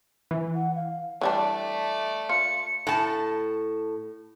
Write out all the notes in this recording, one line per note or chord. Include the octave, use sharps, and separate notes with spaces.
E3
F#5
F5
E3 G3 A3 D4 D5
F4 C#7
A2 A5